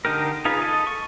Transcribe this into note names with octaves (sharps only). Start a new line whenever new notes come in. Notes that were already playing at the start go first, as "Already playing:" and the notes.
D3 D#4 G4 A#4
D#4 F4 G#4 B4
A4 D#5
C#6